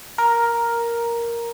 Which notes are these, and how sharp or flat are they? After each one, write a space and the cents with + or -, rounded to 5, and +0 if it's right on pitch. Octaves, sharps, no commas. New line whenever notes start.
A#4 +5